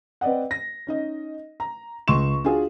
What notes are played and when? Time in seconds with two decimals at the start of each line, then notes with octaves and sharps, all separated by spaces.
0.21 C4 B4 D5 D#5 F#5
0.51 A#6
0.87 C#4 D#4 D#5
1.60 A#5
2.08 C#2 C6 C#6 E7
2.44 D4 F4 F#4 G#4